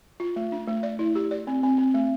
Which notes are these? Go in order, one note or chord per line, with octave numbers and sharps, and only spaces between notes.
F4
A3
D4
A3
D5
E4
G4
D5
C4
C4
C4
A3